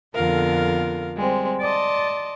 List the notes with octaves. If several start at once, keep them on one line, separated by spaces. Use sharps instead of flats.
F2 D3 B3 F4 A#4 F5
G3 G#3 C4
D5 D#5 A5 C6